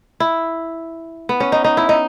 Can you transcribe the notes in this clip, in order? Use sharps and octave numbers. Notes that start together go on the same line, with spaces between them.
E4
B3
C#4
D#4
D#4
E4
D#4